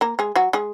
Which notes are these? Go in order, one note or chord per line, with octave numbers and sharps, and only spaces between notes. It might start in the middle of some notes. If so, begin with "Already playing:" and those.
A#3 A#4
G#3 G#4
F#3 F#4
G#3 G#4